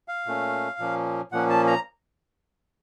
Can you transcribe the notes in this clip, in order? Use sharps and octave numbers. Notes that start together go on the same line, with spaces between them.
F5
A#2 A3 C#4
A#2 F3 A#3 C#4
A#2 F3 A#3 C#4 F#5
A5
A#5